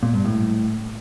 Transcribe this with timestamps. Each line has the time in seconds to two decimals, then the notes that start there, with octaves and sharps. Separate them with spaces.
0.03 A#2
0.14 G2
0.25 A2